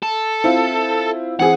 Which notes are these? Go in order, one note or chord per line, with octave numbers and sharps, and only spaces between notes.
A4
C4 E4 F4
E3 C4 G#4 F#5